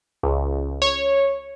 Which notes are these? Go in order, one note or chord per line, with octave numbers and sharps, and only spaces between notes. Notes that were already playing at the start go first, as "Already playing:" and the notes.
C#2
C#5